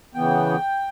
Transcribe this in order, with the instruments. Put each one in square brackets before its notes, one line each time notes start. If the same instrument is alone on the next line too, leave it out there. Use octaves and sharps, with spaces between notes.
[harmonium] C#3 E3 B3 G5